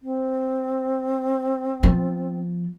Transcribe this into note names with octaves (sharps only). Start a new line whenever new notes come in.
C4
F3 B3